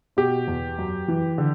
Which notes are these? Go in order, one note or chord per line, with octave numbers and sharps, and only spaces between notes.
B2 G4
E2
F#2
E3
D3